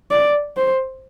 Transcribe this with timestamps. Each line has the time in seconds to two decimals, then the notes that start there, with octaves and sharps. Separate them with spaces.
0.11 D5
0.57 C5